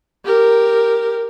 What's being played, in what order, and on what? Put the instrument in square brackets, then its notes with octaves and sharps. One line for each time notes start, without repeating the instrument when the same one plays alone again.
[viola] G4 A#4